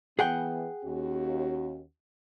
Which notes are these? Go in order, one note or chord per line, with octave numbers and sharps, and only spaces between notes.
E3 B3 G#4 F#5 G5
D#2 C#4 F#4